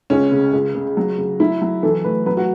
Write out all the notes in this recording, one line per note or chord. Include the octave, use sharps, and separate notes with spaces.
C#2 C#4
C#3
C#2
C#3
F#3
C#3
F#3 E4
F#3
E3 A4
A2 B4
F#3 B4
F#4